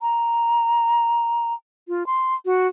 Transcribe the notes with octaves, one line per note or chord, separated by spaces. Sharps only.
A#5
F4
C6
F#4